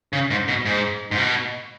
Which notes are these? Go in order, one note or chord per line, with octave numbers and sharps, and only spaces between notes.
C#3
G#2
B2
G#2
G#2
B2